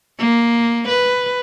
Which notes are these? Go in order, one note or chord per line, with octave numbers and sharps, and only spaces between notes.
A#3
B4